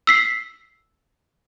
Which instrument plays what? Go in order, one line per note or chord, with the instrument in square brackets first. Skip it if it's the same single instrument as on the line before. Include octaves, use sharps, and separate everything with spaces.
[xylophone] E6 B6 C7